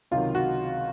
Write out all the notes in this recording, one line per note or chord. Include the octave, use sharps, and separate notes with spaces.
C#2 C3 D#3 F#3 F4
F#4